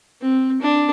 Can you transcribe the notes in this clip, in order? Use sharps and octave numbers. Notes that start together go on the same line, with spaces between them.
C4
D4